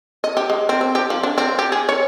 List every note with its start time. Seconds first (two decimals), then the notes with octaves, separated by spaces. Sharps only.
0.24 D#5
0.37 G4
0.50 G#3
0.69 C4
0.81 C4
0.95 G4
1.10 F3
1.23 D4
1.38 C4
1.59 G4
1.72 G#4
1.89 C#5